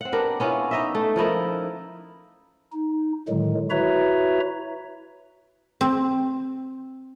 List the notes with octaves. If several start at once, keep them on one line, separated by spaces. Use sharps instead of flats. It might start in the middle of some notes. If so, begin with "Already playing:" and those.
C4 F#5
B3 D4 G4 A#4
B3 C#4 E4 F4
D#4 D#5 E5
A3
F3 D#4 E4 A#4
D#4
A2 D3 D#3 F#3 G#3
E4 F#4 B4 C#5 E5 A#5
C4